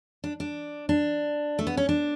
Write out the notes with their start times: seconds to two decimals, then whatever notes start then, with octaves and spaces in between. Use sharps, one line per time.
0.24 D4
0.40 D4
0.89 D4
1.59 A3
1.67 B3
1.77 C#4
1.89 D4